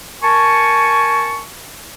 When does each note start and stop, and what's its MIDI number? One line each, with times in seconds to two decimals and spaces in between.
0.22 1.44 70
0.22 1.44 80
0.22 1.44 81
0.22 1.44 85